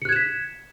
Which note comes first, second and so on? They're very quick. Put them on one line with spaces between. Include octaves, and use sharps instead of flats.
C#7 F#6 G#6 E7 B6